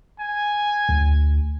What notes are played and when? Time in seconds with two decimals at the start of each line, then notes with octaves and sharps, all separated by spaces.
0.19 G#5
0.89 D2